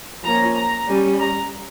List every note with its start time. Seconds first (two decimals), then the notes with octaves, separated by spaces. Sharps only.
0.23 F3 A#3 C#4 A#5
0.55 A#5
0.87 G3 C#4
1.20 A#5